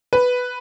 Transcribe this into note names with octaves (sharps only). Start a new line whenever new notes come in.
B4